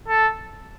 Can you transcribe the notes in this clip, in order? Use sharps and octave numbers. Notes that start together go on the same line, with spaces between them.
A4